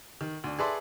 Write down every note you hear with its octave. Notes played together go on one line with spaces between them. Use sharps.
D#3
D2 D4
G#4 A4 B4 D5 E5 C6